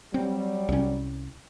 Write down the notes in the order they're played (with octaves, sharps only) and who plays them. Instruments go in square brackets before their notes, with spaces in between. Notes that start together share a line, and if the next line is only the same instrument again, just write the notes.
[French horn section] F#3 G3 [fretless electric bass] C4
[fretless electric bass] C2 C#4